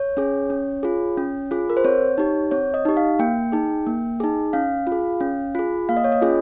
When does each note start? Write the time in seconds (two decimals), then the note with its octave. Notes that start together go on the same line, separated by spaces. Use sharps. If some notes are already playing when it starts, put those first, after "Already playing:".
Already playing: C#5
0.17 C#4 G#4
0.50 C#4
0.83 F4 G#4
1.17 C#4
1.51 F4 G#4
1.70 A#4
1.77 C5
1.84 C4 C#5
2.18 D#4 G4
2.51 C4 C#5
2.74 D#5
2.85 D#4 G4
2.97 F5
3.19 A#3 G5
3.52 D#4 G#4
3.87 A#3
4.20 D#4 G#4
4.53 C#4 F5
4.87 F4
4.92 G#4
5.20 C#4
5.55 F4 G#4
5.89 A#3 F5
5.97 D#5
6.04 C#5
6.12 D#5
6.22 C#4 F4 G#4